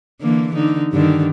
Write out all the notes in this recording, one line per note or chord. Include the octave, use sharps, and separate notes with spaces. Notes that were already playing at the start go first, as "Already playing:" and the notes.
D3 E3 A#3
D3 D#4
G2 D3 D#3